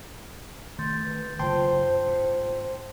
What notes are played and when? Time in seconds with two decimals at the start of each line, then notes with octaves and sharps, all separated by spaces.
0.79 D#3 A3 C6 G6 A6
1.04 B4
1.39 F#1 G#2 F4 C5 G5 A5 C6
2.07 G#2